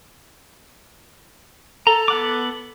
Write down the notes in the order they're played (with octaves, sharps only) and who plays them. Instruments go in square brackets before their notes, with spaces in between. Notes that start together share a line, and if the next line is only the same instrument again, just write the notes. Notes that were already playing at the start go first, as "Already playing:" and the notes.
[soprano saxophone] A4 [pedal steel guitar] A#5
[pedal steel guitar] B3 F#5 D6